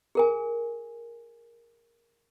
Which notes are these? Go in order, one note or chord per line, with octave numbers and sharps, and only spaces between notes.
G#4 A#4 G#5